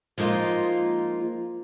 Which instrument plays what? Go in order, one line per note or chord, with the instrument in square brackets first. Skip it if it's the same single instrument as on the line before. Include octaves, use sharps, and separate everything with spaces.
[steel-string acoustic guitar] F3 G#3 A#3 D#4 F4